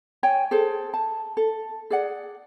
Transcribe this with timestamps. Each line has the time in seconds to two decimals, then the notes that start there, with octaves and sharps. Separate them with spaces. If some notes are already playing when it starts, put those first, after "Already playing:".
0.23 C#5 G5 G#5
0.51 G#4 A4 C5
0.94 A5
1.37 A4
1.90 G#4 D5 F#5